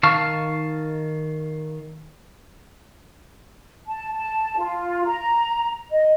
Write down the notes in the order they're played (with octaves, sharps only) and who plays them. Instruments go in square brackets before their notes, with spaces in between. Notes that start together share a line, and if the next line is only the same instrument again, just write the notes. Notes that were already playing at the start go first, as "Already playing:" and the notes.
[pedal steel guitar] D#3 F5 A5 C#6 F6
[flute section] A5
A5
F4
A#5
D#5